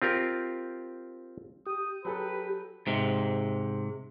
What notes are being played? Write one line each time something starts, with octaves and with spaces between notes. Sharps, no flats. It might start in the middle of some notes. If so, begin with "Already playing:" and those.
C4 F4 G4 A#4 D5
G4 D#6
F#3 G#4 A4 B4
G#2 C3